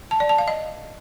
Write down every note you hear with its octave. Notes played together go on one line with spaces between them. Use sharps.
A5
D5
A5
F5
D#5